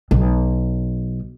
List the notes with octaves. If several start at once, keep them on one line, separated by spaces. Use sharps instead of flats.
B1